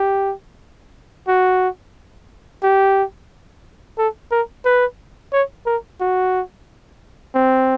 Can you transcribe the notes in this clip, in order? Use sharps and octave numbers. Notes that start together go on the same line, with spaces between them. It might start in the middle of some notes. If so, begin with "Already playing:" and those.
Already playing: G4
F#4
G4
A4
A#4
B4
C#5
A#4
F#4
C4